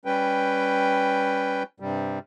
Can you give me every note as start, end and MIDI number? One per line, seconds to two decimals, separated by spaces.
0.05 1.63 55
0.05 1.63 61
0.05 1.63 71
0.05 1.63 79
1.80 2.19 43
1.80 2.19 48
1.80 2.19 55